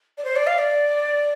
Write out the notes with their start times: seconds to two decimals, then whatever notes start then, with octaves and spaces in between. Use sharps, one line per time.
0.18 D5
0.24 C5
0.36 D5
0.46 F5
0.58 D5